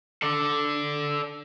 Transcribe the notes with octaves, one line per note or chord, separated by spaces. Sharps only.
A4 D5